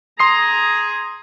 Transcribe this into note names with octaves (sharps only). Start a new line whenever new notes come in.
G#4 A#5 C6 D#6 C7